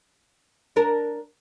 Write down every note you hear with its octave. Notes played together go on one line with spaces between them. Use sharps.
D4 A#4